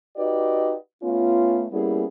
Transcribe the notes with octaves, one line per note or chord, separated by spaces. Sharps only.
D#4 F#4 G4 B4 D5 D#5
A3 B3 C#4 F4
G3 A#3 B3 C#4 E4 G#4